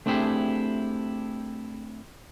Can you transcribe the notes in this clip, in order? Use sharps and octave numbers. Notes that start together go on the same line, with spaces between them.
A3 C4 D4 E4 G4 G#4